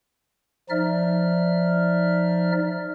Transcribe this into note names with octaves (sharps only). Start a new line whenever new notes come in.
F3 D#4 D5 E5 F6